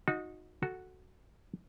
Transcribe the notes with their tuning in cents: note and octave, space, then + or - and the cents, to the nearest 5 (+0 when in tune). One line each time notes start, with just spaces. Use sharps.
D#4 +0 F#4 -30
F#4 +0 A4 +0